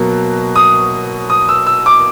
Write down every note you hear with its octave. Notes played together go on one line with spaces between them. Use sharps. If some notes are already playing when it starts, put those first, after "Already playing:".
Already playing: B2 F#3 A#3
D#6
D#6
E6
E6
D6